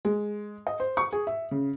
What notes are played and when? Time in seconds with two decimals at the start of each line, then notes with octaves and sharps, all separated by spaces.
0.05 G#3
0.67 D#5
0.80 C5
0.97 C#6
1.12 G#4
1.27 E5
1.51 C#3